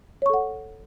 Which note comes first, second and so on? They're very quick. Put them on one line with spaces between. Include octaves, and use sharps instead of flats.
C#5 C#6 A4 F#5